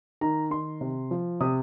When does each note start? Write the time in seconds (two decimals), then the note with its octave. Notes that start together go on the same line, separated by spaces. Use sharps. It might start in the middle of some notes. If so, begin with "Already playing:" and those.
0.21 D#3 A#5
0.50 D#3 C6
0.81 C3
1.11 F3
1.41 C3 D#6